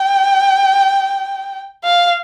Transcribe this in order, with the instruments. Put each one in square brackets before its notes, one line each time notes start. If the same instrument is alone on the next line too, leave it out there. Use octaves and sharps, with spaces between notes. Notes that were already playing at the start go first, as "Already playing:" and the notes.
Already playing: [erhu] G5
F5